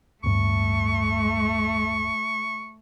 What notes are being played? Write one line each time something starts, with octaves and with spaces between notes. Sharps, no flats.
D1 G2 A3 C#6